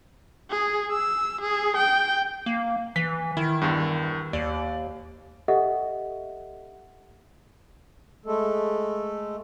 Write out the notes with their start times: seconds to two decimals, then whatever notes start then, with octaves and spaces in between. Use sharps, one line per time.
0.50 G#4
0.91 E6
1.41 G#4
1.77 G5
2.46 A#3
2.96 E3 B6
3.37 D#3 E4
3.61 E2 G2
4.33 D#2 D5
5.48 G4 A4 D#5 E5 F#5
8.26 G#3 A3 A4